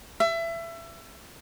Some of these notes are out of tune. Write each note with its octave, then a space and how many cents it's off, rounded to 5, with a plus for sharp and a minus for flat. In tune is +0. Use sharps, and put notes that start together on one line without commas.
E5 +25